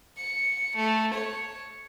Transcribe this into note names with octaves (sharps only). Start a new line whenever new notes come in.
C#7
A3
C#5